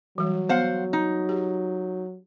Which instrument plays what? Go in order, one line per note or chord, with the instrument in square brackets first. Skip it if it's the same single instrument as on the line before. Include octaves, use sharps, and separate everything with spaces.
[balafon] E3 G3 [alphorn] F#3
[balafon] B3 [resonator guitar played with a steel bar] C5 F5 F#5
[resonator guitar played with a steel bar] D#4
[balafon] G4